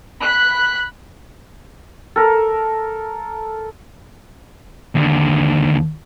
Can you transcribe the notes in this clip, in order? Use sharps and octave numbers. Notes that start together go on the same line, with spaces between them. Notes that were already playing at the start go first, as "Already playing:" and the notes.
B5 F#6
A4 A#4
D#2 D3